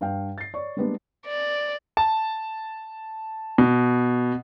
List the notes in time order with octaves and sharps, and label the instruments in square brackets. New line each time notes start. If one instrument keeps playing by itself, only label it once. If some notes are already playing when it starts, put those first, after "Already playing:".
[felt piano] G2 F5 G5
A6 C7
C#5 D5 C#6
G3 G#3 A#3 B3 D4 G#4
[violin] D5
[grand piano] A5
B2